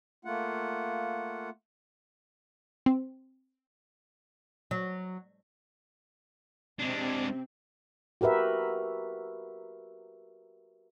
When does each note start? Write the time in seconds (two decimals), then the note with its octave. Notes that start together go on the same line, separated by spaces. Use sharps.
0.25 A3 A#3 F4 F#5
2.86 C4
4.71 F#3
6.80 C3 G#3 C4 D4
8.21 F#4 G4 A#4 B4 E5